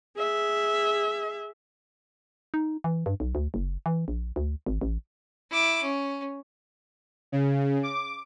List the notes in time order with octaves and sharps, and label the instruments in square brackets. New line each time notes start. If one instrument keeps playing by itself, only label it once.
[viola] G#4 E5
[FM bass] D#4
E3
G2
B1
D2
F#1
E3
A#1
D2
G#1
A1
[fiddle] E4 D6
C#4
[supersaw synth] C#3
D6